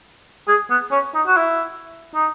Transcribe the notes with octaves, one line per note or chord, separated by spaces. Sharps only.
G#4
B3
C#4
D#4
F#4
E4
D#4